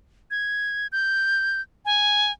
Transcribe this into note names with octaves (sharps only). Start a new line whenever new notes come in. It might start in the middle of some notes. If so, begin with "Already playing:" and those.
G#6
G6
G#5